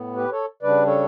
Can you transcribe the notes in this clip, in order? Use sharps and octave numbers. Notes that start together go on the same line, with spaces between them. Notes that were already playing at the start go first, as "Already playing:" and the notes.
Already playing: A2 B3
G4 B4
A4 C#5
C#3 G3 D4 B4 D5
A4 C#5